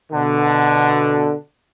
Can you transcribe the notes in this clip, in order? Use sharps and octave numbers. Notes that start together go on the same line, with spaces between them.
B2 D3